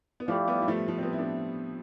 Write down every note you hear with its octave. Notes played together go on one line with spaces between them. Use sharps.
B3
F3 A3 E4 G4 D5 F5
G3 B3
G3
F3 A3
F3 A3
C4
G3 B3
E4
B3 D4